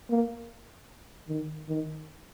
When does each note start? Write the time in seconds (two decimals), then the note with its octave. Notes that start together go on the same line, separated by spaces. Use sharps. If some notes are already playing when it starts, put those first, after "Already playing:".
0.10 A#3
1.29 D#3
1.69 D#3